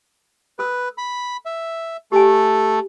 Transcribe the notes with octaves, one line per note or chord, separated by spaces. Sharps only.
A4 B4 E6
B5
E5
A3 G4 A4 G#5